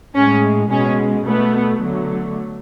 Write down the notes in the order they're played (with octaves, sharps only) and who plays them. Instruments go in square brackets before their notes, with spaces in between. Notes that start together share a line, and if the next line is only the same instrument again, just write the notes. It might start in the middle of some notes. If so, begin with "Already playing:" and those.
[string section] A2 G#3 C#4
B2 G#3 C#4
B2 A3 B3
D3 F#3 A3